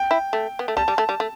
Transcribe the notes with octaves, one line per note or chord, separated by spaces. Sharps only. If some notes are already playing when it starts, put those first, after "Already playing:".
Already playing: G5
E4
A3
B3
A3
G3 A5
G3
A3
G3
A3